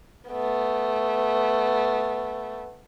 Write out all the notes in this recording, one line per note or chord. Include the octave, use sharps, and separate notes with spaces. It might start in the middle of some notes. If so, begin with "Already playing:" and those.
A3 B3